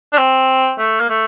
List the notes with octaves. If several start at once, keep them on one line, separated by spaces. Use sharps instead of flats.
D4
C4
A3
A#3
A3